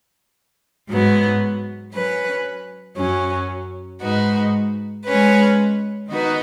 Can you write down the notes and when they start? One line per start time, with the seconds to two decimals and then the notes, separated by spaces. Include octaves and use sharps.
0.89 G#2 F#3 B3
1.94 F#3 C#4 B4
2.97 F#2 F#3 C#4
4.01 G#2 G#3 D#4 F#4 B4
5.05 G#3 C#4 B4
6.09 D#3 B3 D#4 F#4 B4